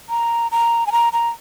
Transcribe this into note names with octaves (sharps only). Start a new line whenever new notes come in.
A#5
A#5
G#5
A#5
A#5